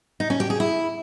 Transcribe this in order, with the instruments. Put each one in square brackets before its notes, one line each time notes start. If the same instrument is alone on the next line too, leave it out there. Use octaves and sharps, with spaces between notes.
[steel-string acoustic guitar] D#4
C#4
G4
G#4
E4